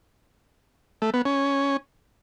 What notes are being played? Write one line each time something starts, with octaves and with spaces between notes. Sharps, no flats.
A3
B3
C#4